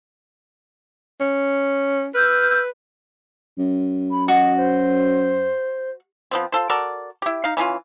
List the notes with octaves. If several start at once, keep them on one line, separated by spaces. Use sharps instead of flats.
C#4
B4 E6 F6 G6
F#2
B5
F#4 D#5
C5
F3 B3 C4
F4 A4 C5
F#4 A4 A#4 D5
E4 G4
D#4 F5
E3 C#4 D#4 F4